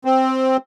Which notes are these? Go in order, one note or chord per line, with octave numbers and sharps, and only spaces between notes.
C4